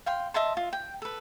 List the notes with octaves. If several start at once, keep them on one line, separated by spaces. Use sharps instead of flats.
F5 G5 C6
D#5 E5 A5 C6
F4
G5
A4 B4